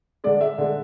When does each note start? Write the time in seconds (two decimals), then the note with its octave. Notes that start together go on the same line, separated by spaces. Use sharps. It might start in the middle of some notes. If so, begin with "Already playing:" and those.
0.24 D3 G#3 D5
0.41 E5
0.58 D3 G#3